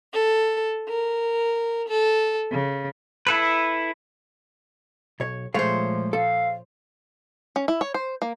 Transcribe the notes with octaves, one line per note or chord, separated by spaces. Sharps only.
A4
A#4
A4
C#3
E4 A4 B4
B1 C#5
A#2 F3 G#3 A3 C5 C#5 F5
A4 F5
C#4
E4
C#5
C5
A#3